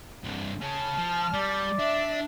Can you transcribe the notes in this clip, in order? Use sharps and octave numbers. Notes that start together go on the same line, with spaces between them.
C2 G2
C#3 C#4 A5 F6
F3
G3 D5
D4 E5